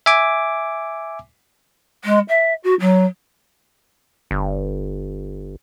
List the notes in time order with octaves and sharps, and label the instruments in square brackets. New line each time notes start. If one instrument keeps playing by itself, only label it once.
[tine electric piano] E5 G#5 D6
[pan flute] G#3
E5
F#4
F#3
[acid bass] G1